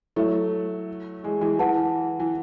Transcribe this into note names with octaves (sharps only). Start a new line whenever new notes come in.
F#3 A3 E4 A4 E5
E3 G#3
E3 G#3
E3 E4 B4 F#5 A5
E3